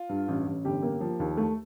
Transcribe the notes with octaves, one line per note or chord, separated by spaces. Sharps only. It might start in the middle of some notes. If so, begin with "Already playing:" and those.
Already playing: F4
G2
A1
A1
G1 G4
A#3
F3
D#2
A3